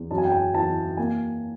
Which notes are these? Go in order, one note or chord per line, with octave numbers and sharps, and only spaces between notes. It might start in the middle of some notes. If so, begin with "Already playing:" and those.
Already playing: E2
F#2 A5
G#5
G5
G#5
E3 A5
A#3 G#5